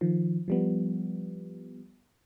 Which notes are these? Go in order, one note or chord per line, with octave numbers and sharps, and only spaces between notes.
D#3 F3
F3 G3 B3